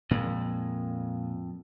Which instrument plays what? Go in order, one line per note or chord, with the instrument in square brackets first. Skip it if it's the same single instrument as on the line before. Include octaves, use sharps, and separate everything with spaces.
[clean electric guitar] F2 [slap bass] A#2 G#3